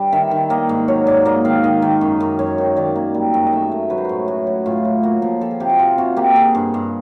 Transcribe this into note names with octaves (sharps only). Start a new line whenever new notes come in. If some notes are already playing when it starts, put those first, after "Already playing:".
Already playing: G2 G3 B4
D#3 E5
D#3
A#3 D#5
G#2
F#3 C#5
G#2 D5
A#3 D#5
D#3 F5
D#3 D#5
D#3
F#2
F#2
F#2 C#5
D#3
D#3 D5
A#3
G3
F#2
D#5
A3 E5
A3
F#3 B4
C5
A2 B4
A2 F#4
F#3
A2 F4
F#3
A#3 F#4
F3
F3 A4
G#4
C3 G4
F#4
C3 F4
C3 F#4
A#3 G4
C3 G#4
G2
G2